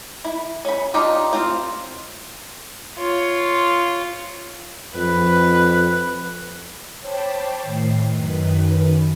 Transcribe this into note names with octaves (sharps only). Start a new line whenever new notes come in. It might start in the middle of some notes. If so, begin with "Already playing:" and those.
E4
C#4 B5
D4 D#4 F4 G4
C4 F4 C5
F4 C#5
F2 B4
C5 C#5 G5 A5 B5 D6
A2 D#3 C7
F#2 D#3 B4